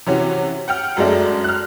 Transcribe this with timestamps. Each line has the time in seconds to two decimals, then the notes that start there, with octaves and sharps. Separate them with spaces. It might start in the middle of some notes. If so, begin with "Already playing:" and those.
0.06 C3 E3 C#4 F#4
0.68 F#5 G5 F6
0.96 F#2 F#3 G#3 A3 D4
1.44 F6 F#6